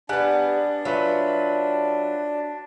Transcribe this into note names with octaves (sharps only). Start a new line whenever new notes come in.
G3 B3 D4 F#5 G#5 F#6
F#3 F4 B4 E5